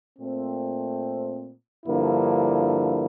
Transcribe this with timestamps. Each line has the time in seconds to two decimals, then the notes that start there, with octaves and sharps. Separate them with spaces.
0.19 A#2 A3 C4
1.86 G2 D3 F3 A#3 E4